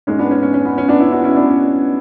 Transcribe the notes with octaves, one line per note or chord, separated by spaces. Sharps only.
G#2 G#3 C#4
B3 D4
C#4
C#4
C#4
B3
C#4
B3 D4
C#4 E4
D4 F#4
C#4 E4
B3 D4
C#4